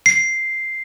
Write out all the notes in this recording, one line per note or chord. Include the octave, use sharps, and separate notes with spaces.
C7